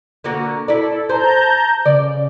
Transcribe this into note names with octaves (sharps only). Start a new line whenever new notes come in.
D3 A#3 F#4
E4 A4 D5
G#4 C5 A5 A#5 G6
C#3 D5